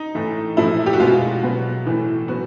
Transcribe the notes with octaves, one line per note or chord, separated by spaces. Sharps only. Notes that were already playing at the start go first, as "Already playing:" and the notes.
Already playing: D#4
A2 E3 A3
A#2 F3 A3 E4
G4
F#4
B2 G#3 B3 F4
F#4
B2 F#3 B3
A2 E3 A3
F#3 B3 F#4